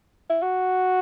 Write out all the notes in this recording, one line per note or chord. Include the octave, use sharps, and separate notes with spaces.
E4
F#4